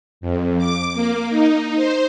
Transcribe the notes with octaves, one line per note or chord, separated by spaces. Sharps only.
F2
D6
A#3
D#4
C5